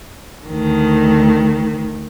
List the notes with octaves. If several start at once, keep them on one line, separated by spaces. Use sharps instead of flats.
D2 D#3